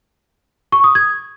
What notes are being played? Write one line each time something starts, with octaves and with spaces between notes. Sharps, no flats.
C#6
D#6
G#6